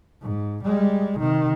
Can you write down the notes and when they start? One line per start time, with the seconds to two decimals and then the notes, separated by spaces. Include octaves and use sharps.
0.22 G#2
0.65 G3 G#3
1.20 C3 D#3